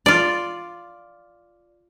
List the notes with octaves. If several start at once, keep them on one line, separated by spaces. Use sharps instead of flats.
F4 D5